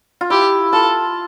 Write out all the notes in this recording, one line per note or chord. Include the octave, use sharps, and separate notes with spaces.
F4
E4 G4
F4 A4